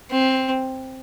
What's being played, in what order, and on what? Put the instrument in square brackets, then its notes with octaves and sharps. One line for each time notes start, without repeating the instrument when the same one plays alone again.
[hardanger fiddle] C4